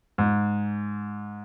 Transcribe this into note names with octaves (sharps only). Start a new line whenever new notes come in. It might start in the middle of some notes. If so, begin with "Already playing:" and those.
G#2